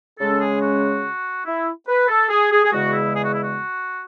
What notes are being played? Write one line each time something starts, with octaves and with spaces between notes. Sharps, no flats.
C#3 G#3 C#4 A4
G#4
F#4
E4
B4
A4
G#4
G#4
G#4
E2 C#3 G#3 F#4
E4
G#4
F#4
E4
F#4